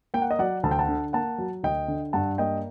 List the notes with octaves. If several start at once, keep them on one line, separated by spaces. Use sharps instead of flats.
A#3 G5
F#5
D#5
F#3 D5 F#5
D2 A5
G5
F#5 A5
D3
A#3 F#5 A5
F#3
D2 D#5 G5
D3
G2 F#5 A5
A#3 D#5 G5